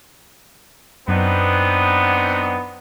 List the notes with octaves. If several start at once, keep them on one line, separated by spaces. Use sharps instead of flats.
F#2 B3 C4 D4 D#4